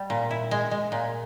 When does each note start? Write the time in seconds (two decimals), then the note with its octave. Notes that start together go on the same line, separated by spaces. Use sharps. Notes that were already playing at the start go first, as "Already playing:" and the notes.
Already playing: G3
0.10 A#2
0.31 E4
0.51 G#3
0.71 G#3
0.92 A#2